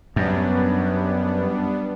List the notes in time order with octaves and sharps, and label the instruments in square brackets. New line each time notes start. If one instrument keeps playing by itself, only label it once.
[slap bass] F#2 [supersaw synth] G3 B3 D4